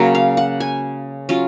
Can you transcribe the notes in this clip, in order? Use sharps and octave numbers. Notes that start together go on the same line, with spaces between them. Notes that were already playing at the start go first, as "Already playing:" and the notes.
Already playing: C#3 F#3 A#3
F5
F#5
G#5
F#3 C#4 F4